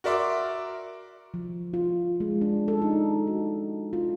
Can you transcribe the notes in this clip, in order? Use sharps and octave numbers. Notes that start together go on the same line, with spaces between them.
F#4 A#4 D5 E5 C6 D6
F3
F4
G#3
D4
A4
D#4
F#4
F4